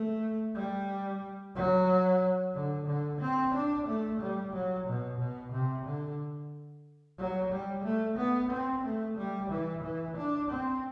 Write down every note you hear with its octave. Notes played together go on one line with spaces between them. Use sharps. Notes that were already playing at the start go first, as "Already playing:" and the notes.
Already playing: A3
G3
F#3
D3
D3
C4
D4
A3
G3
F#3
B2
B2
C3
D3
F#3
G3
A3
B3
C4
A3
G3
E3
E3
D4
C4